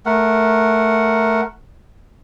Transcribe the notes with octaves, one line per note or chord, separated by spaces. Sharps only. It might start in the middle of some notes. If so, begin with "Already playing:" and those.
A3 A#4 F#5